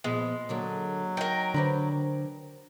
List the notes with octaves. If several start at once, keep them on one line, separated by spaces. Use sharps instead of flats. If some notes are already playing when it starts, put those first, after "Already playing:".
A#2 F3 G#3 B3
D3 F#3 A#3 D4
D#4 A#4 G5
D3 D4 B4 C5